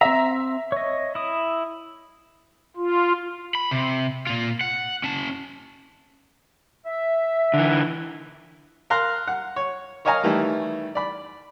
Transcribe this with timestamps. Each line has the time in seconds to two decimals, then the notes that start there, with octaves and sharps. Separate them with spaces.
0.01 C4 E5 A#5
0.72 C#5 D#5
1.15 E4 D#6
2.77 F4
3.55 B5
3.71 C3
4.27 A#2 F4
4.61 F#5
5.04 C#4 A5
6.86 E5
7.54 D3 E3
8.90 A#4 F5 A#5 C6 F#6
9.27 F#5
9.56 C#5
10.05 A#4 C#5 D#5 F5 G#5 A#5
10.24 D#3 E3 G3 A3
10.95 D5 B5